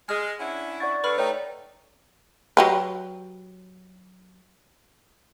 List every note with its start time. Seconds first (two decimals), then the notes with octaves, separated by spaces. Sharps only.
0.09 G#3 F6
0.39 C#4 D4 E4 F#5
0.80 D5 F#5 C#6 A6
1.04 D3 B4 B5 F6
1.18 A3 D#4 C#5 D5 G5 A#5
2.57 F#3 G4 B4